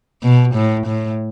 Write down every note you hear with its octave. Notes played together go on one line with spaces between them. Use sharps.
B2
A2
A2